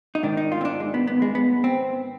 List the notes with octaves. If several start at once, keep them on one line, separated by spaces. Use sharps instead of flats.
D#4
G#2 D#3 D4
D#4
F4
C4
D4
G#3
B3
B3
G#3
B3
C4